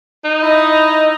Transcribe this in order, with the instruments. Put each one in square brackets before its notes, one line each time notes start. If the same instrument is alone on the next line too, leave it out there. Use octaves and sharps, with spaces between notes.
[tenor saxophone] D#4
[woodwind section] E4 D#5